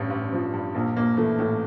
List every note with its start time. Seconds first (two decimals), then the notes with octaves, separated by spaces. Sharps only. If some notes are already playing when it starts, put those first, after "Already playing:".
Already playing: A1 G2 C#4 D4
0.10 A1
0.32 F3
0.53 G2
0.74 A#1 A#3
0.95 A#1 A#3
1.17 E3 A3
1.39 A2 A3